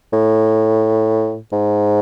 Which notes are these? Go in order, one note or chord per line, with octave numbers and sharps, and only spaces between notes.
A2
G#2